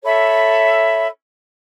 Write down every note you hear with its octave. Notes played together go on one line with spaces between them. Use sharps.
A4 C#5 E5 B5